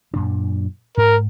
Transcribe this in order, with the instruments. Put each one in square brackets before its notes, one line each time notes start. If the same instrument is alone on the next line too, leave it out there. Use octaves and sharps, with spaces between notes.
[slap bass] F#2 A#2 D4
[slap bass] G#2 [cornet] A#4